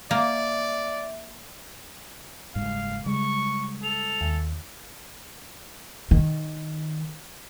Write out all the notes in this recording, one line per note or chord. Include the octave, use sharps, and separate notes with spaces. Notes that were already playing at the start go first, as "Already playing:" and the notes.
A#3 D5 E5
F#1 G#2 G3 F5
C#3 G3 G#3 C#6
A4 F7
D#2
D#3